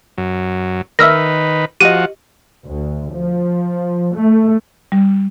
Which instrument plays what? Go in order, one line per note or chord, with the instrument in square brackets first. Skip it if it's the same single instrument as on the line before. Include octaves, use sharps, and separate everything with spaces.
[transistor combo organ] F#2
[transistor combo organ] D#3 B4 [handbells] A#4 D#5 E5 [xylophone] E6 F6 A#6
[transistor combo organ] F3 F#4 [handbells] G4 D#5 [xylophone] D#7
[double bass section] D2
F3
A3
[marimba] G3